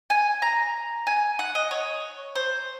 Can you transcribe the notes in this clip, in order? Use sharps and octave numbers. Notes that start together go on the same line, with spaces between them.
G#5
A#5
G#5
F#5
D#5
C#5
C5